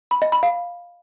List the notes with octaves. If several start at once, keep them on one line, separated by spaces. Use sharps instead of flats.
B5
D#5
B5
F5